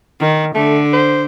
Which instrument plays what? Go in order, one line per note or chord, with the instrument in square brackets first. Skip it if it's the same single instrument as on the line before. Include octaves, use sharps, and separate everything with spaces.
[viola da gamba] D#3
[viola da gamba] D3 [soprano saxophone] A3
[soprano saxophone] C5